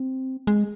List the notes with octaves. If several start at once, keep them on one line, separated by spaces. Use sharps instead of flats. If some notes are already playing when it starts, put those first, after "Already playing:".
Already playing: C4
G#3